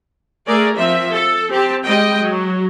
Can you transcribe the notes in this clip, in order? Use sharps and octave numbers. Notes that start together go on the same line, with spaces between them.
A3 G#4 A#4 D5
F3 C4 E5
A4
C4 G4 A5
G3 G#3 D#5 G5
F#3